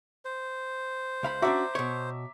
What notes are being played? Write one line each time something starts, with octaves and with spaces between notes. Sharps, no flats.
C5
C#2 F5 B5
C#4 D4 F#4 E5 A#5 D6
B2 C#5